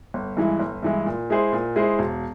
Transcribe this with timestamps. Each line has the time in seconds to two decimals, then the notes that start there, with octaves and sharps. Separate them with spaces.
0.14 G1
0.37 G2 E3 G#3 E4
0.60 G1
0.83 G2 E3 G#3 E4
1.06 A#2
1.30 G#3 E4 G#4 C5
1.52 A#2
1.76 G#3 E4 G#4 C5
1.99 E1